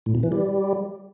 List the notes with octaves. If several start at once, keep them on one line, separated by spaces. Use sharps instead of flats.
A2
B2
E3
G3